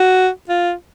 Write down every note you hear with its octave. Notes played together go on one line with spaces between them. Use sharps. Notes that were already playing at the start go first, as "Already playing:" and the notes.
Already playing: F#4
F4